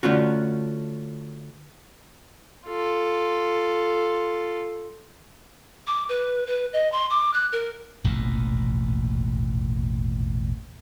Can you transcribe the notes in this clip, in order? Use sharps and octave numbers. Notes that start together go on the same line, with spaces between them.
D3 A3 C#4 F4 F#4
F4 A4
D6
B4
B4
D#5
C6
D6
F#6
A#4
E1 A1 D#2 A#2